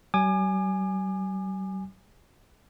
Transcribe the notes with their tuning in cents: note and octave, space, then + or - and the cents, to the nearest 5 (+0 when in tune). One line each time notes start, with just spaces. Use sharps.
G3 -45 G#5 +0 D6 +40